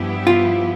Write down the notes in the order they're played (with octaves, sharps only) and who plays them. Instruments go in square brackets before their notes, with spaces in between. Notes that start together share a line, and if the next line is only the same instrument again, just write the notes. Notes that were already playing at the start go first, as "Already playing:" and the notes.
Already playing: [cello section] G2 F3 B3 E4 G4
[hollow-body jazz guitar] F4